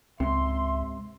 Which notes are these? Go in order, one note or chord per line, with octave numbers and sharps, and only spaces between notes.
C#2 G#2 C3 E5 C6